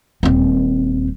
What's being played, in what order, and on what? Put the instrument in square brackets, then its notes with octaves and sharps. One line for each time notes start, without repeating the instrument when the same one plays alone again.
[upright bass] D#1 C4